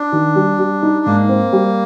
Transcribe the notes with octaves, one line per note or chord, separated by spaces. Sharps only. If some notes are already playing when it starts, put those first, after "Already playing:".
Already playing: D4
D#3
G3
G3
D#4
G#2 A#3
C4
G3